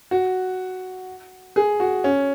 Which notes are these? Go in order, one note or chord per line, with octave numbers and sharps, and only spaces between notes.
F#4
G#4
F#4
C#4